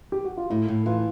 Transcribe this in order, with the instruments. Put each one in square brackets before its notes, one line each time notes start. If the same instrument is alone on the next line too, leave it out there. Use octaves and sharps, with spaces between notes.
[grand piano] G4
F#4
F4
[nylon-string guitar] A2 [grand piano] E4
[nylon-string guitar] A2
[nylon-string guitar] E3 [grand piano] F4